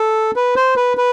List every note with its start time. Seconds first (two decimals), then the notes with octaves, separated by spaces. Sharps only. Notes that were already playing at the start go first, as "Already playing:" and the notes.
Already playing: A4
0.36 B4
0.56 C5
0.76 B4
0.97 B4